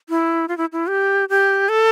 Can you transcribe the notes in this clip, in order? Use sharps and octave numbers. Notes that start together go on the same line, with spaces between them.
E4
F4
E4
E4
G4
G4
A4